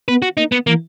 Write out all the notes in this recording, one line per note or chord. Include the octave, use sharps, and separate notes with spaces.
B3 B4
F#4
A#3 D#4
B3
E3 A#3